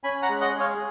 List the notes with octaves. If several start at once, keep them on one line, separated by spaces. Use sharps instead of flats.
C#4 G#5 B5
F#5 A#5
G#3
D#5 F#5
G#4
C#5 F5